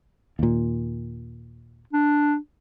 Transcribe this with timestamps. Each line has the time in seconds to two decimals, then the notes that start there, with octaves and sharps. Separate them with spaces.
0.39 D#2 A#2
1.93 D4